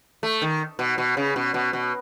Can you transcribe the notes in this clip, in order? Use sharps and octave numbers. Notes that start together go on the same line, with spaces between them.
A3
D#3
B2
B2
C#3
B2
B2
B2